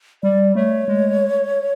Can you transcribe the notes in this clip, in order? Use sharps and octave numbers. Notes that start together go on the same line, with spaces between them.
G3 D5
A3 C#5
G#3